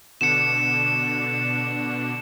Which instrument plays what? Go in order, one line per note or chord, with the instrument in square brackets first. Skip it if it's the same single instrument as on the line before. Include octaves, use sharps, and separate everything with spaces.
[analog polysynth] B2 D3 D4 [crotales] C#7 E7